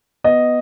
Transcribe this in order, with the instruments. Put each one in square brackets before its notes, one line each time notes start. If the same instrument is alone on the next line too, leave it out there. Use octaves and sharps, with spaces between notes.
[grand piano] B3 D#5